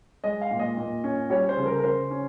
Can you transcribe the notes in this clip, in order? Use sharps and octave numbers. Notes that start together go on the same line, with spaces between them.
G#3 D#5
F5
A#2
D#5
A#2
C#4
G3 C#5
C5
C#3
A#4
A#4
C#3 C5
C#4